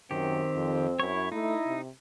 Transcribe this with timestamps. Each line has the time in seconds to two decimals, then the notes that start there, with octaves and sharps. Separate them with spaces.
0.11 F#2 D#3 C4 G4
0.56 F2
1.00 F#2 E4 C#5
1.32 A3 D#4 E4
1.67 C3